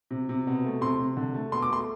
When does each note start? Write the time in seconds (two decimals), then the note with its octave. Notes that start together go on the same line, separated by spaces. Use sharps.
0.11 C3
0.29 C3
0.47 B2
0.65 A3
0.81 C3 C6
0.99 C3
1.17 D3
1.34 A3
1.52 B2 C6
1.62 D6
1.70 A3 C6